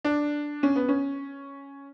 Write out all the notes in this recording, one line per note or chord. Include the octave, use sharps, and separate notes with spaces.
D4
C#4
B3
C#4